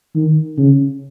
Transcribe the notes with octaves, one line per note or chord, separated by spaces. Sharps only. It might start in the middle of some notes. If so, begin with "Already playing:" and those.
D#3
C#3